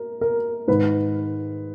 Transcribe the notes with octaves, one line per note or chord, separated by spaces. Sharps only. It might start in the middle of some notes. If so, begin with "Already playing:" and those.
Already playing: A#4
A#4
G#2 D#3 B4